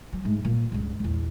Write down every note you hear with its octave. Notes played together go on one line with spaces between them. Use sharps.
F#3
G#2 A3
A#2 A#3
C#2 G2
A#1 E2